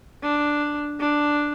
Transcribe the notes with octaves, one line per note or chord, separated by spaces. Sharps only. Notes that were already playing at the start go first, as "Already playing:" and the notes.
D4
D4